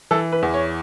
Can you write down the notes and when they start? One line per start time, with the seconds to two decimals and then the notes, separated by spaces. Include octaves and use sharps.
0.11 E3 A4
0.32 B4
0.42 E2
0.54 C#5